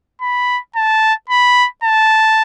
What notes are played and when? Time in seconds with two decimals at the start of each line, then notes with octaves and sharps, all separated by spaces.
0.21 B5
0.76 A5
1.29 B5
1.84 A5